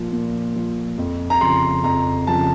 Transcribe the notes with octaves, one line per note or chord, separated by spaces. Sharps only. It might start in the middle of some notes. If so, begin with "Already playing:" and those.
Already playing: A#2 F3
A#2
F3
F2
A#5
C#3 F3 C6
F2 A#5
C#3 F3 A5